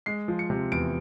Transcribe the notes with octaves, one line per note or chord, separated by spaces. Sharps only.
G#3 C7
F3
C#7
C3
E2 D7